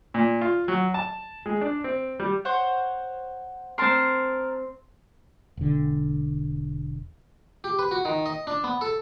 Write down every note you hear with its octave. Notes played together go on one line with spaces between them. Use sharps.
A#2
F4
F#3
A5
G#3
D4
C4
G3
C5 C#5 F#5
C4 A#4 A5 C6
E1 D3
G4
B4
F#4
D#3
D#5
D4
B3
A4